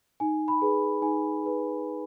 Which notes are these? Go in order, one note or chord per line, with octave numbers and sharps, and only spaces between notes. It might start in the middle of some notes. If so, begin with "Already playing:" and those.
D#4 G#5
B5
G#4 B4
D#4 G#5
G#4 B4